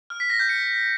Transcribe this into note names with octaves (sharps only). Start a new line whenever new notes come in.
F6
B6
A#6
G6
C#7